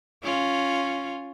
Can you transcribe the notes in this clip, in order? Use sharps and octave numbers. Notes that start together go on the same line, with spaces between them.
C#4 F4